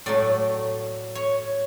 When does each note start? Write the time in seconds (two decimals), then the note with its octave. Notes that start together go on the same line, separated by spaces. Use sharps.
0.06 A2 F#3 A3 D5
1.15 C#5